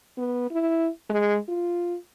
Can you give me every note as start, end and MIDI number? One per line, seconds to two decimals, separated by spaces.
0.18 0.50 59
0.51 0.89 64
1.10 1.37 56
1.49 1.97 65